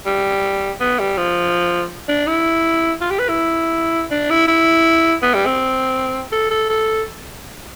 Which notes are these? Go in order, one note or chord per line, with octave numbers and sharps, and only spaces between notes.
G3
B3
G3
F3
D4
E4
F4
G4
B4
E4
D4
E4
E4
B3
G3
C4
A4
A4
A4